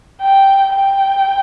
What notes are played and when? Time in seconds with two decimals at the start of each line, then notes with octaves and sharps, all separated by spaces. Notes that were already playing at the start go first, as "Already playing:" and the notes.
0.22 G5
0.74 G5